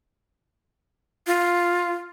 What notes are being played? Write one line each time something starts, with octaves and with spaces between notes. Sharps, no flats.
F4